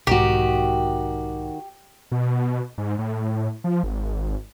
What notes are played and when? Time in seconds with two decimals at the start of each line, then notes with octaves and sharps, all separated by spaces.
0.07 B1 G#2 D#3 F#4 G4
2.11 B2
2.78 G#2
2.99 A2
3.64 F3
3.83 G#1